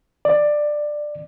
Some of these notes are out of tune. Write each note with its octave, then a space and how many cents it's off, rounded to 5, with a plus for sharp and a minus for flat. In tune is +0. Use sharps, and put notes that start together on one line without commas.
D5 +15